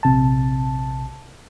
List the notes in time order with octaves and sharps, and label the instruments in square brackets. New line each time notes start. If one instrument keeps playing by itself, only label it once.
[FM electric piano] A#1 C3 A5